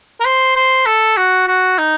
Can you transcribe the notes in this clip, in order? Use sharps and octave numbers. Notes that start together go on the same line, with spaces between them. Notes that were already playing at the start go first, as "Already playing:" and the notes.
A#4
C5
C5
A4
F#4
F#4
D#4